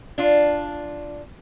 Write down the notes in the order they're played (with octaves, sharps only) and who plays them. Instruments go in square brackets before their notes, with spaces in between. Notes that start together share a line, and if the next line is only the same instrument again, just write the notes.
[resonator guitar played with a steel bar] D4 F4